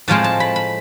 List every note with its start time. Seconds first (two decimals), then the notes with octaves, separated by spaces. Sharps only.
0.08 A2 F3 G#3 C4 A5
0.24 A5
0.40 B5
0.56 B5